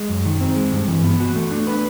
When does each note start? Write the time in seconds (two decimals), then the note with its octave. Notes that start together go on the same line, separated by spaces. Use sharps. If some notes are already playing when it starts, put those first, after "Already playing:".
Already playing: G#3
0.09 F#2
0.26 D#3
0.41 C4
0.56 G#3
0.72 G2
0.88 E3
1.04 B3
1.20 F#4
1.36 A3
1.51 D4
1.67 B4